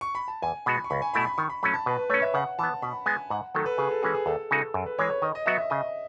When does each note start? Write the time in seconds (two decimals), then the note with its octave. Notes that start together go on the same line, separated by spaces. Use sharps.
0.01 C#6
0.15 B5
0.28 A5
0.42 E2 G#5
0.66 B2 G#3 B3 F#4 B5
0.84 C#6
0.90 C#2 B5
1.02 G#5
1.14 B2 A3 E4 B5
1.27 B5
1.38 D#3 C#6
1.50 B5
1.63 F#3 A3 C#4 B5
1.74 A5
1.86 B2 B4
1.98 B4
2.10 A3 C#5
2.14 C#4
2.22 E5
2.34 C#3 F#5
2.59 E3 B3 A5
2.82 B2 B5
3.06 G#3 B3 G#5
3.30 G#2 F#5
3.54 D#3 F#3 A3 A4
3.66 B4
3.78 C#3 G#4
3.91 A4
4.02 E3 G#3 C#4 F#4 G#4
4.14 G#4
4.26 D#2 A4
4.51 C#3 G#3 D#4 F#4 A4
4.74 F#2
4.86 B4
4.98 E3 G#3 C#5
5.10 C#5
5.22 D#3 D#5
5.35 D#5
5.46 F#3 B3 F#4 E5
5.58 E5
5.70 C#3 D#5